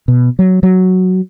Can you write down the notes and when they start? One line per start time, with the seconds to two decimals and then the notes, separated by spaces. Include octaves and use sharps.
0.08 B2
0.39 F#3
0.63 F#3